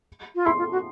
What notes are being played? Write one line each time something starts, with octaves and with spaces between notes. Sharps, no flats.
F4
E4 C6
F4
F#4